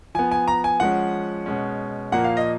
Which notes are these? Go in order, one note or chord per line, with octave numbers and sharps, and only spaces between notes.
F3 B3 G#5
G#5
A#5
G#5
F3 G#3 C#4 F#5
B2 G#3 C#4
A#2 F3 A#3 F#5
F5
D#5